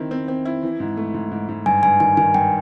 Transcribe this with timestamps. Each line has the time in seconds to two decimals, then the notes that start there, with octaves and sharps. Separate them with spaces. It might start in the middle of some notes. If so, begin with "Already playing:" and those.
Already playing: D#3 C4 E4
0.11 C4
0.28 C4
0.45 E4
0.63 E3
0.80 G#2
0.97 A3
1.14 G#2
1.32 G#2
1.49 G#2
1.66 G2 G#5
1.83 G2 G#5
2.00 D#3 G#5
2.17 D#3 G#5
2.34 G2 G5